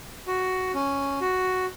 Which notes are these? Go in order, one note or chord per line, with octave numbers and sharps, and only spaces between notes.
F#4
C#4
F#4